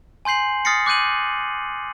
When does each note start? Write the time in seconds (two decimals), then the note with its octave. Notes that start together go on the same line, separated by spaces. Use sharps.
0.25 G#5 C6 G6 C7 F#7
0.65 D#6 F6 A6 A#6 C7 C#7
0.86 D6 F#6 G6 D#7 F#7